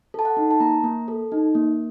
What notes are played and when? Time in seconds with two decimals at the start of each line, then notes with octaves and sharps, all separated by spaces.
0.14 A4 A5
0.25 F#5
0.37 D#4
0.51 A5
0.60 A#3 A#5
0.84 A#3
1.08 A4
1.32 D#4
1.55 A#3